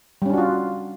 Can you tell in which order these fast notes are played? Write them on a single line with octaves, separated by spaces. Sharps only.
G3 C#4 D4 F#4 F4